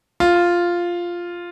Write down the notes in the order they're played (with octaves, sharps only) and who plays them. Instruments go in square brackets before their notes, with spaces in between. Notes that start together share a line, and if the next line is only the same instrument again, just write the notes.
[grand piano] F4